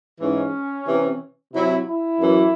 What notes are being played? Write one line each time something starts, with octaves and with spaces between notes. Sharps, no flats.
G#2 E3 C#4
C3 E3
C3 F#3 E4
E4
F#2 E3